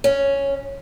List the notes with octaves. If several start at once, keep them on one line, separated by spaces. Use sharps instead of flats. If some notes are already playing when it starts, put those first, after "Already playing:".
C#4